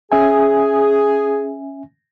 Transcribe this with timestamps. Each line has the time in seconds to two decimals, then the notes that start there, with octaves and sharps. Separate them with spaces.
0.12 C#4 G#4 E5 G#5